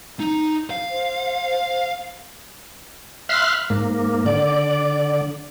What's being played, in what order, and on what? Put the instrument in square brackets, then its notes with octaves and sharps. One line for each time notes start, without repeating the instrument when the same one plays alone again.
[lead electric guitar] D#4
F5
[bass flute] C5
[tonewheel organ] E5 F5 B5 C6 F6 F#6
G#2 A#3
D3 D5